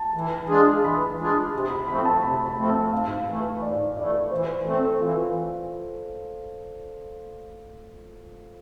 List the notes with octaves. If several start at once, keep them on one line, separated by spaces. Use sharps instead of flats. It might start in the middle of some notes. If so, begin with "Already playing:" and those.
Already playing: A5
E3
G#3 D4 F4 G#4
E3 B5
G#3 D4 F4 G#4
C3
B5
F3 A3 C4 B5
A5
C3 B5
B5
F3 A3 C4
A5
G#2 F5
E3 A3
G#2 D5
E3 A3 D5
E3 C5
A3 C4 A4
E3 F4